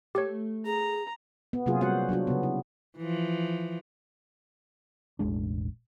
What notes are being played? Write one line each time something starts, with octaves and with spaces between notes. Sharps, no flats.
A3 G4 A4 C#5
G#4 A#5
B3
C3 F#3 A#3 F4 G#4
G3 F#4 C5 F#5
F#3 D4 F4 F#4
C#3 B3
E4
E3 F3
E1 A1 G#3 D4